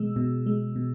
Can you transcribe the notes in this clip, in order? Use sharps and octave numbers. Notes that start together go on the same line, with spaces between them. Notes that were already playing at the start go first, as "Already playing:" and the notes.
Already playing: B2 G#3 E6
B2
G#3
B2